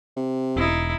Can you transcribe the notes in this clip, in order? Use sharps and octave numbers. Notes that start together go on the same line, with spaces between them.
C3
E1 D#4 E4